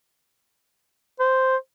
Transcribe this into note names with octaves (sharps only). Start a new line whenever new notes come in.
C5